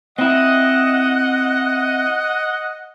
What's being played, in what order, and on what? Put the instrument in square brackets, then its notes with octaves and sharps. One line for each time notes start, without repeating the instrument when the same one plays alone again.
[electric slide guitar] C4 E4 [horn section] D#5 [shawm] F#5